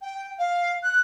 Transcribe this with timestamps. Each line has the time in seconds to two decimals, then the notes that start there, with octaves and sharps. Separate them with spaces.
0.01 G5
0.38 F5
0.83 F#6